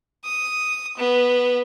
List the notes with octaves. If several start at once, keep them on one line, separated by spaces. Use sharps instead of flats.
D#6
B3